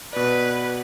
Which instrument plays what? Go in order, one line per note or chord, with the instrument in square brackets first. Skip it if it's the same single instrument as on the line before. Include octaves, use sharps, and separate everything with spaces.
[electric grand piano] B2 D5 [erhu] B4